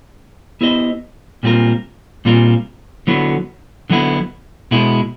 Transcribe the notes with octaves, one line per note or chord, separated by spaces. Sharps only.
B3 E4 G4 C5 D#5
A#2 G3 C4 F4 A#4
A#2 G3 C4 F4 A#4
D3 F#3 B3 E4
D3 F#3 B3 E4
B2 G#3 B3 E4